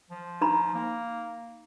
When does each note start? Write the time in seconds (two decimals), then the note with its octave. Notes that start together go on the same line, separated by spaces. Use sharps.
0.11 F3
0.41 D#4 A#5 B5
0.74 A#3